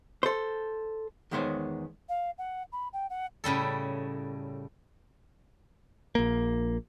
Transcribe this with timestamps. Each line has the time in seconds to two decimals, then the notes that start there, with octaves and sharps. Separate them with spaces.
0.23 A4 C5
1.31 E2 D#3 G#3 B3 C5 C#5
2.09 F5
2.38 F#5
2.72 B5
2.93 G5
3.10 F#5
3.44 A2 C#3 G3 A4
6.15 A#1 A#3